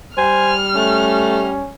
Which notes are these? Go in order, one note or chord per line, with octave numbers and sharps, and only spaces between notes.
G3 C5 G#5 F6
A3 C#4